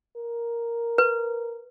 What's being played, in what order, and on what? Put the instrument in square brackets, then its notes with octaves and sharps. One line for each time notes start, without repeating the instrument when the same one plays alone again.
[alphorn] A#4
[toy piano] B4